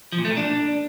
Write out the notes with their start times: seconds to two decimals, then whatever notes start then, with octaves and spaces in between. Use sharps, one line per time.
0.12 F3
0.19 A#2
0.25 A3
0.31 A#2
0.37 D4